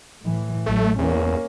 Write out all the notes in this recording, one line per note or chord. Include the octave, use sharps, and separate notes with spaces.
A2 E3
A1 F#3 A3
E2 A#3 C#4